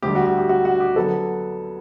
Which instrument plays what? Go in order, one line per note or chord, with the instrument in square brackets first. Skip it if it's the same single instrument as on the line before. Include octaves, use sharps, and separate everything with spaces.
[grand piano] D2 D3 G3 G4
F#4
G4
G4
F#4
F#4
G4
D3 F#3 B3 A4